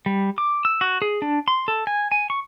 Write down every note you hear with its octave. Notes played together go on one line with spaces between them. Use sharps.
G3
D6
E6
F#4
G#4
D4
C6
A4
G#5
G#5
C#6